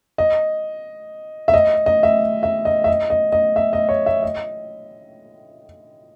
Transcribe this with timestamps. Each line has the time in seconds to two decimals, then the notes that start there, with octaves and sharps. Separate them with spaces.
0.18 D#5
1.48 E5
1.54 D#5
1.86 D#5
2.03 E5
2.43 E5
2.65 D#5
2.84 E5
2.88 D#5
3.10 D#5
3.32 D#5
3.56 E5
3.73 D#5
3.89 C#5
4.06 E5
4.23 D#5